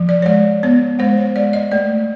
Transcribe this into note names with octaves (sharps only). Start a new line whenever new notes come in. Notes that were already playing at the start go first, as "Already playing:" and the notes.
Already playing: F3
D5
C#5
G#3 D5
B3 C#5
G#3 C5
C#5
G#3 D5
D#5
A3 D5